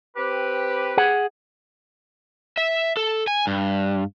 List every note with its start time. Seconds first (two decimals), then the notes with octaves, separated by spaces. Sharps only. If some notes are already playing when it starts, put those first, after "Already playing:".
0.17 C4 G4 B4
0.97 G#4 F#5
2.57 E5
2.97 A4
3.27 G#5
3.47 G2